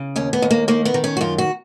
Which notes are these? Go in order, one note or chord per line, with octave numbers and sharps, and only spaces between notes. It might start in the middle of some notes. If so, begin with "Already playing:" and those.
Already playing: C#3
D#2 C#4
B3
D#2
A#3
D#3 A#3
B3
D#3
C#4
F#4
F#2 F4
F#4